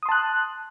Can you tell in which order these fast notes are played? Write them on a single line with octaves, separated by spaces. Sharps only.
D#6 C6 A5 F#6